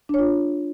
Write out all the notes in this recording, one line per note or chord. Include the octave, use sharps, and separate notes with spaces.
D4 F4 C#5